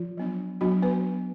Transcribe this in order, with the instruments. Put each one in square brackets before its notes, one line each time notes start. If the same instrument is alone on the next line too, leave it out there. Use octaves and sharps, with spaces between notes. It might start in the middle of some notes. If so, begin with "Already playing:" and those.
Already playing: [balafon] F3 F4
F#3 B3 D4
F#3 B3 D4 F#4
B3 B4